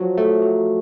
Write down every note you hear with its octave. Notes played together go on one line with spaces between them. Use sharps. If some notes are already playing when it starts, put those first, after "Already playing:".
Already playing: F3 F#3
A3
F#3